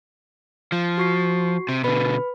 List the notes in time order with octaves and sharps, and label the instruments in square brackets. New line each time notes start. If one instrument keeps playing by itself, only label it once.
[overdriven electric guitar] F3
[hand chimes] F#4 C#6 C7
[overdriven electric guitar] C3
[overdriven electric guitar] B2 D3 [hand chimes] B4 B5